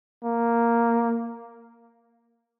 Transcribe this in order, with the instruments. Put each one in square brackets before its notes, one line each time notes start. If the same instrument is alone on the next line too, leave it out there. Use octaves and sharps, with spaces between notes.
[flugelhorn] A#3